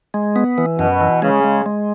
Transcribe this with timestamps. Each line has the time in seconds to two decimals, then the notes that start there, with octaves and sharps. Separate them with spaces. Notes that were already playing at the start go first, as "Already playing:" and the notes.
0.14 G#3
0.36 B3
0.58 E3
0.79 F#2 B2
1.01 E3
1.22 C#3 G#3
1.44 G#3
1.66 G#3